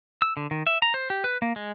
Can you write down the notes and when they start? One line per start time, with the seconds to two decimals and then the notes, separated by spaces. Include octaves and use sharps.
0.22 E6
0.37 D3
0.51 D#3
0.67 E5
0.82 A#5
0.94 C5
1.10 G4
1.24 B4
1.42 A#3
1.56 G#3